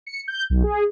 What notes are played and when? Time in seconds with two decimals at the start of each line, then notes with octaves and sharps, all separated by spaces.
0.07 C#7
0.28 G6
0.50 B1
0.64 G#4